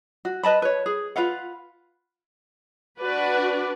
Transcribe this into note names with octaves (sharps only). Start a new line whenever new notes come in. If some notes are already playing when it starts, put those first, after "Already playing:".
F#4
B4 D#5 A5 B5
B4 C#5
G#4
F4 B4 F5 F#5
D4 F#4 B4 D5